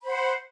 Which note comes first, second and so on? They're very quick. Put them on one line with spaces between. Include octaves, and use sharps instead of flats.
B5 C5 F#5